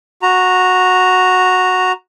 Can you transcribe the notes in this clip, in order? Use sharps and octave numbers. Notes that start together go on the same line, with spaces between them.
F#4 A#5